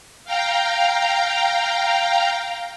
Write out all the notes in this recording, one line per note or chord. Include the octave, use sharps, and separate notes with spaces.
F5 G5 A#5